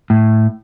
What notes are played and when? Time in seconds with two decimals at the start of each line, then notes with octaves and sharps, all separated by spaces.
0.10 A2